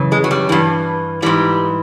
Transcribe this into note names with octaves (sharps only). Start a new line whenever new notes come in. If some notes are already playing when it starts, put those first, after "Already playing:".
Already playing: F#2 C#3 E3
G#3
F#3
G3
G2 E3
G#2 E3 G3